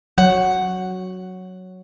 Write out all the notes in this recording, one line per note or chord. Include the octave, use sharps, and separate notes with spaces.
F#3 C#5 F#5